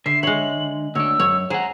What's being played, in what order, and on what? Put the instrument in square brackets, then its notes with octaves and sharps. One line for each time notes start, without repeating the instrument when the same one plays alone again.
[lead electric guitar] D3 [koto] E5 [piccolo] C7
[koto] G#3 C#5 [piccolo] F#7
[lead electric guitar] D2 D4 [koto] C#5 [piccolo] E6
[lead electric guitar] F#2 [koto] C#5
[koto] G#4 [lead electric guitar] C5 F#5 [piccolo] A#5